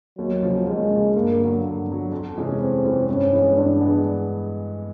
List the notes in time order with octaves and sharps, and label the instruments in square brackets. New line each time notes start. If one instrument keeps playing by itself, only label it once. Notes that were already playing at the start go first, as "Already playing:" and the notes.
[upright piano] D#2 [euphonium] F#3
[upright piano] C#3 F3
[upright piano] D#2 [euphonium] G#3
[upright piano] C#3 F3
[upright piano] G2 [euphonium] A#3
[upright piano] D3 F#3
G2
D3 F#3
F2
C3 E3 G#3 C#4
[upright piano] F2 [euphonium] C4
[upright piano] C3 E3 G#3 C#4
[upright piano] G2 [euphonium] C#4
[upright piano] E3 G#3 B3
[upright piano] G2 [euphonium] D4
[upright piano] E3 G#3 B3